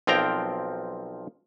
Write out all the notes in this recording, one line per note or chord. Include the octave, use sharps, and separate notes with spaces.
B1 F3 C4 A#4 G5 A#5